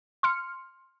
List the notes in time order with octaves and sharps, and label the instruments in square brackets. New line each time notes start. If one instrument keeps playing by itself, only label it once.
[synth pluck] C6 F6 C#7